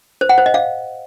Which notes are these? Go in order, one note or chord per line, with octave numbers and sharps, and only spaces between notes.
C5
F#5
C5
D#5
F5